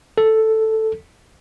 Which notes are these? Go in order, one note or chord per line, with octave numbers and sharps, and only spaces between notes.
A4